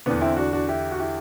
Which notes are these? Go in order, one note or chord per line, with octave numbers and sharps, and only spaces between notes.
E2 D3 B3 D4
C4 E4
D4 F#4
D4 F#4
E4 G4
F#4
E4 G4